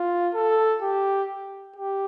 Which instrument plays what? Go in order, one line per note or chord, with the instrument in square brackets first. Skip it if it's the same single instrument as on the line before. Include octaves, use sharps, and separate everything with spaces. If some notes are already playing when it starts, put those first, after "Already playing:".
Already playing: [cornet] F4
A4
G4
G4